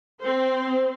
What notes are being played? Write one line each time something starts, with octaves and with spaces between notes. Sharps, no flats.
C4 C5